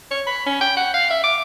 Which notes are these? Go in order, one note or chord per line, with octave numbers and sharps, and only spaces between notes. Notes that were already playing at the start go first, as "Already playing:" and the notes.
C#5
B5
C#4
G5
F#5
F5
E5
D6